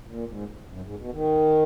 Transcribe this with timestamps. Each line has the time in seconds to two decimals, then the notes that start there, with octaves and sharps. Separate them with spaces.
0.07 A#2
0.26 G#2
0.67 F#2
0.81 G#2
0.97 B2
1.12 D#3